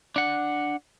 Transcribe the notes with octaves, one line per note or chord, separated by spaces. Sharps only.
D4 F#5